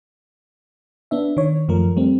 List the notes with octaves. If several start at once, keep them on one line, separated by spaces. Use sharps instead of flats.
B3 D4 E5
D#3 C#5
F#2 F3 A3 A#4
G3 A3 C4